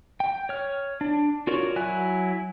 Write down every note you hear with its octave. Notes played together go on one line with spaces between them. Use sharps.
G5
C#5 F6
D4
F4 F#4 A#4 C#5 D5
F#3 E4 G#5 F#6